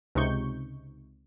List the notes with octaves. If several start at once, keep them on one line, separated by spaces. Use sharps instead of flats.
C#2 C3 D#4 C#6 G6